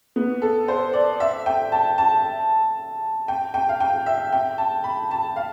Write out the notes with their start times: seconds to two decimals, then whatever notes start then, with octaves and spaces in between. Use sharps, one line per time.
0.16 B3
0.42 A4
0.68 C5
0.93 D5
1.20 E5
1.46 G5
1.72 A5
1.98 A5
3.28 G5
3.54 G5
3.69 F5
3.80 G5
4.06 E5
4.33 G5
4.58 A5
4.84 B5
5.11 A5
5.36 F5